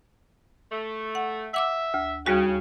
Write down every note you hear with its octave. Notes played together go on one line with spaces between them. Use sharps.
A3
F#5
E5 F#5 D6 E6
D2
D#2 C#3 G3 F#4